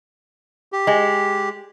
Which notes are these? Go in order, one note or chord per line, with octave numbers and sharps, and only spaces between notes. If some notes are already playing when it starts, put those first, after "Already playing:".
G4
G#3